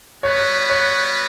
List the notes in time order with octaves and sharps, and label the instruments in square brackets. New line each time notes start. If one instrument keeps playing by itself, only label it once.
[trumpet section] G3 B3 F#4 B4 [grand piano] C#5
[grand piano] C#5